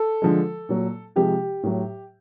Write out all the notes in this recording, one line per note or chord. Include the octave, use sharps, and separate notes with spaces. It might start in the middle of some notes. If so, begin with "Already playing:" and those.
Already playing: A4
D3 F3 G#3
A#2 F#3
C3 F3 G#3 G4
A2 F#3